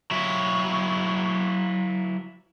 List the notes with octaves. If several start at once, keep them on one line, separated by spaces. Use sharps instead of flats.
F#3 E4